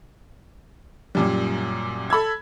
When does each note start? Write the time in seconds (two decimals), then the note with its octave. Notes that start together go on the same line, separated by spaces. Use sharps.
1.15 F#2 A#2 G3
2.10 A4 B5 E6 G#6